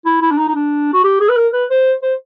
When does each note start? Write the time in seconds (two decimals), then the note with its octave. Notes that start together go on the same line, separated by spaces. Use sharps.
0.05 E4
0.22 E4
0.31 D4
0.38 D#4
0.48 D#4
0.55 D4
0.93 F#4
1.04 G4
1.21 G#4
1.29 B4
1.36 A#4
1.53 B4
1.70 C5
2.03 C5